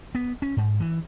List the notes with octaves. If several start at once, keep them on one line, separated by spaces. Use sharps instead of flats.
B3
C#4
G#2
E3